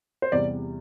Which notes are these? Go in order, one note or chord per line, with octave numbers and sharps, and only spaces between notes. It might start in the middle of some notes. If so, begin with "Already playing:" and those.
C5
E2 C3 G3 D5